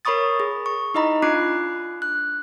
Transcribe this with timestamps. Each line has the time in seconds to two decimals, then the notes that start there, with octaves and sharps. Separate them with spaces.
0.05 A#4 C#5 B5 C#6 D#6 A6
0.40 G#4
0.66 C#6
0.94 D#4 E4 D#5 A#5 B5
1.22 D4 F4 D6 F#6 C7
2.02 F#6